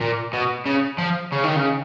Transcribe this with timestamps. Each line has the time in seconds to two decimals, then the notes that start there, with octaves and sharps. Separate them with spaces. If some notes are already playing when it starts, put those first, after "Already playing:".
0.01 A#2
0.33 B2
0.66 C#3
0.98 F3
1.32 C#3
1.44 D#3
1.56 C#3